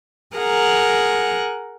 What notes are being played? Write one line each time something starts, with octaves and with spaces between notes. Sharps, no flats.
G#4 A#4 F#5 A#5